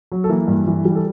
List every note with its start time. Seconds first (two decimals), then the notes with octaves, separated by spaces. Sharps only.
0.12 F#3
0.24 A4
0.29 E3 A#3 A#4
0.48 G2
0.67 E3
0.85 G3
0.95 A4